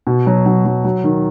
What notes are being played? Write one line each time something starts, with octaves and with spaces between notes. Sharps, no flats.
B2
F#3
F#3
F#3
F#3
D#3